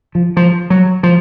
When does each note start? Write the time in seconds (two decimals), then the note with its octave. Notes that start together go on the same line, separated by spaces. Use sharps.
0.15 F3
0.37 F3
0.70 F#3
1.03 F3